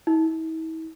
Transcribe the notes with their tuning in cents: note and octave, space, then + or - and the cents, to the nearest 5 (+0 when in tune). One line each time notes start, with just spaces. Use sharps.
E4 -40